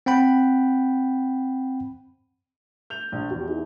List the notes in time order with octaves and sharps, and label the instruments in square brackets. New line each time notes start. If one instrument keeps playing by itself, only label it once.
[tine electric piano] C4 F#5 G5 B5
[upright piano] G6 F7
A#1
[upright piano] E2 [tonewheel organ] F#4 G4
[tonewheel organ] D#4 E4 G#4